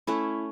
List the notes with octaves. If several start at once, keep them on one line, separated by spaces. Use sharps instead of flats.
A3 C#4 E4